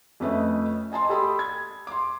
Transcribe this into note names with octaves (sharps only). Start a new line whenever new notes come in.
F2 A3 C#4 B4 D#5 E5
D#5 G#5 A5 C6
G4 A4 B5 C6 D#6
G#6
C6 D6